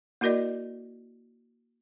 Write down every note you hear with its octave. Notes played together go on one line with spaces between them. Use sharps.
A#3 E4 F#4 A#4 D5 D#5